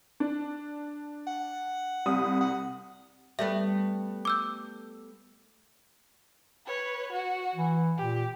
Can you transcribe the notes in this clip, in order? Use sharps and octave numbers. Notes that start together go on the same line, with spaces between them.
D4
F#5
C2 C3 D#6
F#5
G3 A3 B3 E5
D6 E6 G6
B4 C#5
F#4
E3
A#2 G4